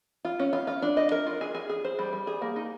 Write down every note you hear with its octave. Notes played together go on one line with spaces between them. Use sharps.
F4
C#4
F4
F4
D4
D#5
A#4
F4
G#4
G#4
G#4
C5
G3
G3
G#4
A#3
D#4